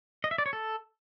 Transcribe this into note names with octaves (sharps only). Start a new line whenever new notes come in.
D#5
E5
D5
C#5
A4